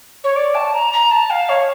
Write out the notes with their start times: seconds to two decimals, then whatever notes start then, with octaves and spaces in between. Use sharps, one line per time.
0.24 C#5
0.36 D5
0.54 A5
0.74 A#5
0.93 A#5
1.11 A5
1.30 F5
1.49 C#5